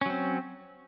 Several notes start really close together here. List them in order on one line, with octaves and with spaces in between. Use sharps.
C#4 F#3 C4